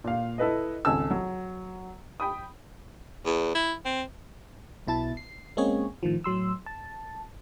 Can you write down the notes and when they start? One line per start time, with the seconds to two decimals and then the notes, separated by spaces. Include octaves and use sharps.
0.04 A#2 F5
0.38 E4 A4 B4 D#5
0.85 G#1 C#2 A4 G#5 A5 E6
1.11 F#3
2.20 G5 B5 D#6
3.26 E2
3.55 E4
3.85 C4
4.87 B1 B2 E4 A5 A6
5.17 C7
5.57 G#3 A#3 C4 C#4 G#4 C#5
6.03 A2 D#3 F3
6.24 A2 F#3 C6 E6
6.66 A5